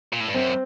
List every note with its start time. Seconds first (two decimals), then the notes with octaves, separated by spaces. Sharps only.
0.12 A#2
0.20 A2
0.28 G2
0.34 F#2 C4